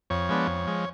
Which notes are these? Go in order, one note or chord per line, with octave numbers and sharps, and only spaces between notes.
F2 C#5
F3 G#3 B3 D4
F2
F3 G#3